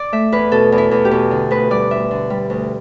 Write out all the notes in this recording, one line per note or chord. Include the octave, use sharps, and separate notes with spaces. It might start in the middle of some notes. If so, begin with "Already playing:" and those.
Already playing: D5
A3 E5
E2 B4
B2 A4
E2
E4
E2
G4
B2
D3
D2 B4
G3 D5
D2 E5
D3
G3
D2